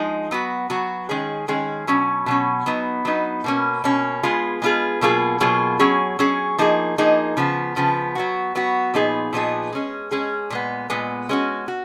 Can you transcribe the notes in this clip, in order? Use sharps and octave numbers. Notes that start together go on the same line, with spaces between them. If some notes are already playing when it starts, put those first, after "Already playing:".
Already playing: F3 G#3 D#4
F#3 B3 F#4
F#3 B3 F#4
D#3 G#3 C#4 G#4
D#3 G#3 C#4 G#4
B2 F#3 C#4
B2 F#3 C#4
F#3 B3 D#4
F#3 B3 D#4
B2 A#3 C#4
B2 A#3 C#4
G#3 B3 F4 G#4
G#3 B3 F4 G#4
B2 F#3 A#3 F4 G#4
B2 F#3 A#3 F4 G#4
F#3 C#4 G#4
F#3 C#4 G#4
F3 A#3 D#4 G#4
F3 A#3 D#4 G#4
C#3 F3 B3
C#3 F3 B3
F#3 B3 F#4
F#3 B3 F#4
A#2 F3 B3 D#4 G#4
A#2 F3 B3 D#4 G#4
G#3 C#4 G#4
G#3 C#4 G#4
A#2 G#3 B3
A#2 G#3 B3
G#3 C#4 F#4
F#4